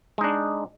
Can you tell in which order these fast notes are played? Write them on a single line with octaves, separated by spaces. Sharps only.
G#3 D#4 D4